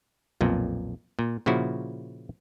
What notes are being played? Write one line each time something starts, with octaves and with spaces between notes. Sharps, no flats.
B1 F2 A#2
A#2
A#2 C#3 F3 E4 F#4